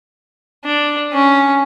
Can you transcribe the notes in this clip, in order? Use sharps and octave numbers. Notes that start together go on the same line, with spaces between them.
D4
C#4